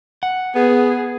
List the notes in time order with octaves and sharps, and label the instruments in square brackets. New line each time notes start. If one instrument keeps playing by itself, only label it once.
[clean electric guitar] F#5
[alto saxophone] B3 [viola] G#4